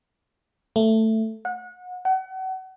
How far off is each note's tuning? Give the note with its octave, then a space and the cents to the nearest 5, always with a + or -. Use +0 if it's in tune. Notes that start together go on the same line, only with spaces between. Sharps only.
A3 +10
F#5 -30
F#5 +35